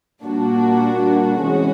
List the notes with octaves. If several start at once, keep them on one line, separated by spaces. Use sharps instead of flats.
A#2 G3 A#3 D4 F#4
C3 E3 G#3 C#4 F#4